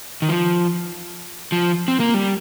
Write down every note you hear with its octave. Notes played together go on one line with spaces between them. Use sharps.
D#3
F3
F3
C4
A#3
G3